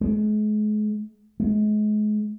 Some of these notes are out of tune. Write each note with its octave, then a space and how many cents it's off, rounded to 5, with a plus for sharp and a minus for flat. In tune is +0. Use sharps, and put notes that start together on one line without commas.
G#3 +40
G#3 +35